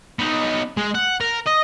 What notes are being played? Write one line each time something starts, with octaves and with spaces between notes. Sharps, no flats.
B3 D#4
G#3
F#5
A#4
D#5